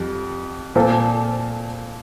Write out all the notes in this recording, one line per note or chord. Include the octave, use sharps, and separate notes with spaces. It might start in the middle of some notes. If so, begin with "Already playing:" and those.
Already playing: F2 G3
A#2 F3 C4 F4 A4